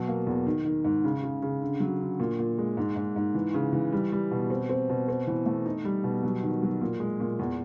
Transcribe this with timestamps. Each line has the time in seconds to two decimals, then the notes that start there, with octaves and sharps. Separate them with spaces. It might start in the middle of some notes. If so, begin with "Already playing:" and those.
Already playing: B2 F#3
0.08 A#3
0.27 E2
0.47 D#3
0.65 D#3
0.84 G#2
1.04 C#3
1.23 C#3
1.42 C#3
1.61 D3
1.80 F#3
2.00 D3
2.20 A#2
2.39 A#2
2.58 G#3
2.77 G#2
2.96 G#2
3.16 G#2
3.34 E3
3.54 C#3
3.73 E3
3.93 G3
4.12 G3
4.31 B2
4.50 C4
4.69 C4
4.89 B2
5.09 C4
5.27 E3
5.46 A3
5.66 D#4
5.84 G3
6.04 B2
6.23 F#3
6.43 D#3
6.63 F#3
6.81 A#2
7.00 G#3
7.20 A#2
7.39 E2